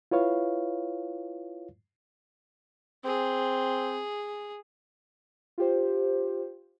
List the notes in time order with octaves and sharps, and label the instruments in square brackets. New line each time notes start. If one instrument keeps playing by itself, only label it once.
[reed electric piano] E4 F4 B4 C#5 F5
[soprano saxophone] C4 [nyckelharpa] G#4
[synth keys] F4 G4 C5